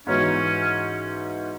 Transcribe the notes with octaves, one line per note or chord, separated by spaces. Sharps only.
G#2 E3 B3 C#4 F#4 C#5